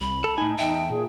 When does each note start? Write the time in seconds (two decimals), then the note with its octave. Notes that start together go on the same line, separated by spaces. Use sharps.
0.01 C2 B5
0.24 A4 A5
0.38 A2 D#4 G#5
0.59 E2 E5 G5
0.90 A#2 G#4